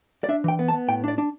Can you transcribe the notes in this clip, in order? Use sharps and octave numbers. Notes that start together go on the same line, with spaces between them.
D5
D4 E5
E3 G5
B3
A5
B3
A2 G5
D4 D5
D4